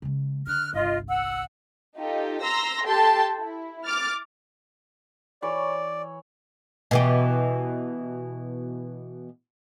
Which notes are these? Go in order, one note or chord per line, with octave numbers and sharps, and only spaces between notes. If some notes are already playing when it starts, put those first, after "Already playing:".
C#3 G#3
D3 F6 F#6
G1 C2 F4 D#5
F#5 E6
D#4 F4 G4 A4
A#5 C6 E6 A#6
G4 A4 G5 A5 C6
E4
D6 F6 A6
E3 C#5 D5 B5
B2 E3 G4